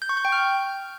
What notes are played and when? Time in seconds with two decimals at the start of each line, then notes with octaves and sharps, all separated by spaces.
0.02 G6
0.09 C#6
0.17 G6
0.25 G5
0.32 F6